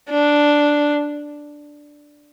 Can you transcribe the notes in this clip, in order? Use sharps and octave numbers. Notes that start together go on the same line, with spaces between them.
D4